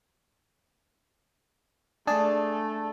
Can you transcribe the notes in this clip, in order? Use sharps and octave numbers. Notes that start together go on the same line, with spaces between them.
A3 D4 G#4 A5